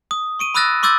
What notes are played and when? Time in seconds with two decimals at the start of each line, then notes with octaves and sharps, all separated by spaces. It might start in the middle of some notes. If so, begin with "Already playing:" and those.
0.11 D#6
0.39 C#6 D7 D#7
0.54 B5 D#6 E6 F#6 A6 A#6
0.83 C6 D6 E6 G6 A6